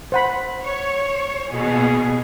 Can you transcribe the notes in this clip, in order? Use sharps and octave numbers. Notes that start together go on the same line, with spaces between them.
C5 F#5 B5
C#5
B2 G#4